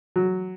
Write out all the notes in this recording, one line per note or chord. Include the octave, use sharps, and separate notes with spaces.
F#3